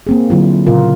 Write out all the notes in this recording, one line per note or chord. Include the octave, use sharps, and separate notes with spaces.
A#3 C4 G#4
D3 F#3 E4 F4
A#2 C#3 F4 A#4